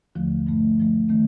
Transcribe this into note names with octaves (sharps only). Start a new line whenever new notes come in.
D#2 D3 F3 A3
G2 F3 A3
G2 F3 A3
D#3 A3 C4